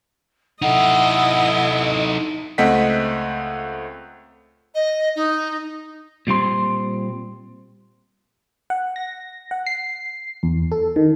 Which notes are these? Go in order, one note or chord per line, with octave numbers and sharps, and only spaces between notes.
D#4 E4 A4 D#5 F#5
C#2 A3 C4 D#5 F#5 B6
D#5
D#4
A#2 G3 C4 C6
F#5
A#6
F#5
C7
E2
A4
D#3